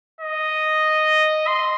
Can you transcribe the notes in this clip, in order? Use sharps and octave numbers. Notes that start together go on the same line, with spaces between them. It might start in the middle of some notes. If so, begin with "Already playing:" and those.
D#5
C6